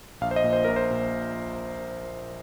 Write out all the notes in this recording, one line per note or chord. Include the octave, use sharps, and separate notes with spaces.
A#1 F5
C5
D#5
A#2
C5
A#1 A#4
C5
A#2